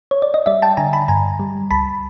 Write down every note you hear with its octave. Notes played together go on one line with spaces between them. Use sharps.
C#5
D5
D#5
G3 D5 E5
G5 A5
D3 G#5 A#5
A5 B5
G2 G#5 A#5
G3
C#2 A5 B5